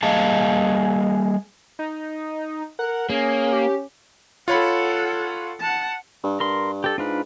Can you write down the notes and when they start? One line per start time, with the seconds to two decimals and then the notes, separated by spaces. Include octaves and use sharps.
0.03 G3 A#3 G#4 D#5 F5 A5
1.79 D#4
2.79 A#4 F#5
3.10 A#3 C#4 G#4
3.53 G4
4.48 F4 A4 C#5 F#5 B5
5.59 F#5 A5
6.24 G2
6.40 G2 A#4 C6
6.84 G4 A4
6.98 G#2 D4 F4 B4